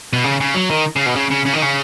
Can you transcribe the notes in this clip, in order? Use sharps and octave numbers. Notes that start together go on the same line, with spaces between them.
B2
C#3
C#3
F#3
D#3
C#3
B2
C#3
C#3
C#3
D#3
C#3